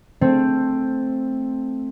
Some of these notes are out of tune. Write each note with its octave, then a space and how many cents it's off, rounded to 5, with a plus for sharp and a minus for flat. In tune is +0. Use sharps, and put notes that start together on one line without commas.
A3 +0 C4 +5 C5 +0